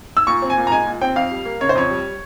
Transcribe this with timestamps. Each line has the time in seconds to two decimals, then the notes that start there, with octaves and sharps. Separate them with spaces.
0.17 E6
0.27 A#2 C#6
0.42 C4
0.50 G#5
0.57 A#2
0.67 A#5
0.72 G#3 G#5
0.87 A#2
1.01 C4 G5
1.16 F2 F5
1.31 G3
1.45 A#3
1.61 C#3 C#5
1.69 C5
1.75 F2 C#5
1.90 G3